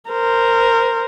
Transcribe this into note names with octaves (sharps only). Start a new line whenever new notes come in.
A#4 C5